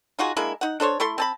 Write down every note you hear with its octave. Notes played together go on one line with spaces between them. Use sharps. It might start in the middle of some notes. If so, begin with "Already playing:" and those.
D#4 F4 F#4 G#4
G#3 A#3 D4 E4
D#4 F#5
D4 A4 C5 C#5
A3 E4 A4 C6
C4 A5 B5